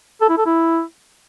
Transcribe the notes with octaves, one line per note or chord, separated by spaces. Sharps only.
A4
E4
A4
E4